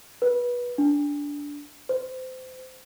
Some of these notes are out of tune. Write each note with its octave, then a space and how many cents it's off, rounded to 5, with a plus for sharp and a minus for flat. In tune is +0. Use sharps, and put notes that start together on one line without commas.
B4 -20
D4 -15
C5 -25